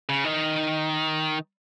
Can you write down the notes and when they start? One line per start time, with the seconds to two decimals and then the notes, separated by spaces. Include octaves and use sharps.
0.09 C#3
0.24 D#3